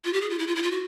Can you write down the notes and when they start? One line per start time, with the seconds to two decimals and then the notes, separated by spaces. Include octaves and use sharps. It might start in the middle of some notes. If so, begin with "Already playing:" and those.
0.05 F4
0.13 G4
0.21 G#4
0.30 F4
0.39 E4
0.47 F4
0.55 E4
0.63 F4
0.71 F#4